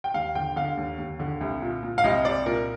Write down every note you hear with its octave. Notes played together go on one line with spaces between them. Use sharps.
G5
D#2 F5
D3 G5
D3 F5
D#2
D#2
D3
C2
A#2
A#2
F5
C2 D#5
C2 D5
A#2 A#4